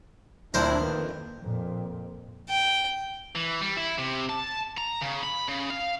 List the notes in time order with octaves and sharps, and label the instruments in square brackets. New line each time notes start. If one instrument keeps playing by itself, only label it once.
[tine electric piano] D2 A#2 [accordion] C4 D4 E4 [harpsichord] A#4 C5
[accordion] F2 [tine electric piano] D#3 A#3 B4
[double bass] F2 A#2
[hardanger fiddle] G5
[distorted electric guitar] E3
G3
E4
C3
A5
A#5
C#3
B5
C#3
F5